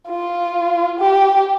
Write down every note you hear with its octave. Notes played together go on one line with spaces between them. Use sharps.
F4
G4